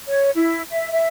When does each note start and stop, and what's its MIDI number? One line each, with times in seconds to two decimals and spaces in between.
0.08 0.29 73
0.35 0.62 64
0.71 0.90 76
0.92 1.08 76